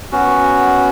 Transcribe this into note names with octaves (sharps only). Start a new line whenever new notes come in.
B3 C#4 F#4